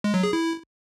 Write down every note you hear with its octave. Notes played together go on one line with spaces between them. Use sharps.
G#3
F#3
G#4
E4